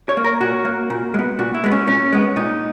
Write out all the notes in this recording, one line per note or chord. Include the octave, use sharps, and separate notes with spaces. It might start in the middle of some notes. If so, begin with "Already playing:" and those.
C#5
A#3
A#4
A#2 F#4
A#3
A#2
G#3
B3
A#2 F#4
E4
G#3 B3
C#4
A#2 C#4
G#3 B3
A#2 D#4